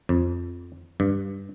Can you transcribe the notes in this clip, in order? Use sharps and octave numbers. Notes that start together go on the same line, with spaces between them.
F2
G2